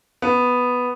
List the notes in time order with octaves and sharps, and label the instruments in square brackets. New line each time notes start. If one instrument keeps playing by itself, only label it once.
[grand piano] B3